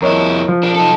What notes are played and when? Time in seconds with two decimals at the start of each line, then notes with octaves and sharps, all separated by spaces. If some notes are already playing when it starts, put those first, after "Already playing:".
0.02 F2 E4 A#4 C#5 D#5
0.48 F3
0.63 D4 A#4
0.75 D#4 A4